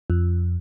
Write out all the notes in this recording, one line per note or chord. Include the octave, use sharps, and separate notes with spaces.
F2